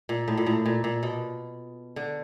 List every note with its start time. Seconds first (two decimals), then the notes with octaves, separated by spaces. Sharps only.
0.09 A#2
0.28 A2
0.38 A#2
0.47 A2
0.66 A#2
0.84 A#2
1.03 B2
1.96 D3